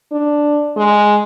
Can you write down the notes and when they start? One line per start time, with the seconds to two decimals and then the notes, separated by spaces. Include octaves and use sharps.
0.12 D4
0.77 G#3